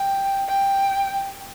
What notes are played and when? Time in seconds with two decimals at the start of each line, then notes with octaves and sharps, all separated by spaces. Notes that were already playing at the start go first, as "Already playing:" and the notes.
Already playing: G5
0.48 G5